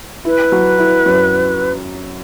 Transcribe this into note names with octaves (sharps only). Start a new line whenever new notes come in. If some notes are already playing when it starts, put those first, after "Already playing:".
E4 B4
F#3
E4
F#2